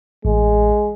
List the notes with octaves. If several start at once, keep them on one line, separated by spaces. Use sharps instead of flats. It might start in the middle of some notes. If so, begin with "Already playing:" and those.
A1 G#3